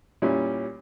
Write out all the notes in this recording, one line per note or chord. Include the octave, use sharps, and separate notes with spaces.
A#2 G3 C#4 E4